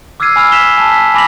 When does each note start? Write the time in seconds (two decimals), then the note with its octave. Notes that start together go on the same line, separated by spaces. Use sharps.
0.20 D6 E6 F6 G#6 C7 D#7
0.36 G#5 B5 E6 F6
0.52 F#6 B6 E7 F7 G7
0.77 G#5 A5
0.90 B6
1.14 G#5 B5 D6 A#6 B6 F#7